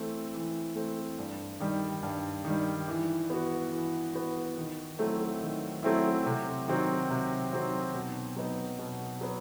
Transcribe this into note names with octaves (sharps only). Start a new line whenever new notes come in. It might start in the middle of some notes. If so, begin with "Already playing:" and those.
Already playing: E3 A3 C4
E3
A3 C4
G2
D#3 G3
G2
D#3
G3
E3
B3 F#4
E3
B3 F#4
D#3
F#3 A3 C4 E4
D#3
F#3 A3 C4 E4
C3
D#3 F#3 C4 F#4
C3
D#3 F#3 C4 F#4
B2
F#3 B3 D#4
B2
F#3 B3